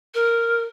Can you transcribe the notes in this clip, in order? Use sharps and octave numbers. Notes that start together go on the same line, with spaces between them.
A#4